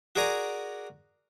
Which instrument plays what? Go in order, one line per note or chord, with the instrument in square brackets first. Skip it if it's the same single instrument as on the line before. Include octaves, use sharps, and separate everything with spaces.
[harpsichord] F#4 G#4 A#4 D5 G#5 A#5